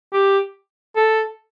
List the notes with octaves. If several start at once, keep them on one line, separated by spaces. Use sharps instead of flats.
G4
A4